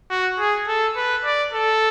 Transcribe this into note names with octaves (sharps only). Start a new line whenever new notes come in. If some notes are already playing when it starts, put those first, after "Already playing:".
F#4
G#4
A4
B4
D5
A4